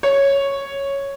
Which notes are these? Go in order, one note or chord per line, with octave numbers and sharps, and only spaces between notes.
C#5